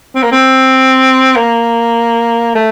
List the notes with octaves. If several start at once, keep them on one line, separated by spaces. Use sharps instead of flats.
C4
A#3
C4
A#3
A3